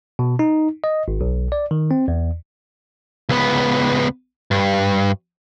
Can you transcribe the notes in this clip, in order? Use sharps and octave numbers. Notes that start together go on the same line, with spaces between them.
B2
D#4
D#5
G#1
B1
D5
D#3
C4
E2
C#2 B3
G2